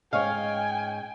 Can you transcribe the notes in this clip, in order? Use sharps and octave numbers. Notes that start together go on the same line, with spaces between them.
G#2 C#4 C#5 D#5 F5 G5 G#5